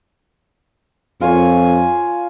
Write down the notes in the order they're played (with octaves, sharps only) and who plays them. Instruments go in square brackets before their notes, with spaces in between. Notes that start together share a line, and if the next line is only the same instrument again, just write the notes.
[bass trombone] F2 [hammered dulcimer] F4 C#5 [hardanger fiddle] G#5